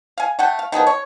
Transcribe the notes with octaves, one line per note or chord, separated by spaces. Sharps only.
F5 G#5
A3 F#5 G5
F5
D#3 F3 B3 G#4
C#5